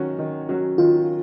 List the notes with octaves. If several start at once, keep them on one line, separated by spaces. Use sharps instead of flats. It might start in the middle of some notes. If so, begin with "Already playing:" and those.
Already playing: D#3 F#3 C#4 F#4
D#3
F#3 C#4 F#4
D#3 F4